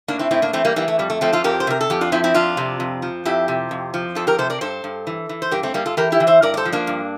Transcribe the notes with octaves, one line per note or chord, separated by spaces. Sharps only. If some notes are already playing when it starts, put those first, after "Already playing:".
A2 A#3 D4
C4 E4
A2 C4 E4
A#3 D4
E3 A3 C4
G3 A#3
E3 G3 A#3
A3
F2 G3
A3
F3 A3 C4
F4 A4
F2 G4 A#4
C5
C3 A#4
A4
F2 G4
D4 F4
F3 C4 E4
C4 E4
F2 D4 F4
C3
F2
F3
F2 E4 G4
C3
F2
F3
F2 F4 A4
G4 A#4
C3 A4 C5
A#4 D5
G2 A4 C5
G2
E3
E3
C5
G2 G4 A#4
A3 C4
G2 G3 A#3
F4 A4
E3 G4 A#4
E4 G4
E3
C5 E5
G2 A#4 D5
D5
A4 C5
F3
A#3 D4
G2